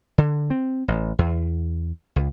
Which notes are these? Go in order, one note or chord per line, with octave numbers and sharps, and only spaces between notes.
D3
C4
A1
E2
C#2